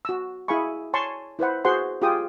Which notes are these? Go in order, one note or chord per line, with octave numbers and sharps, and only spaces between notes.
F#4 E6
E4 G#4 F5 G#5 B5 C#6
C#5 G#5 A5 C6 C#6
E4 B4 C5 F#5
F#4 G#4 C5 F#5 C6
F4 G4 G#4 G5 D#6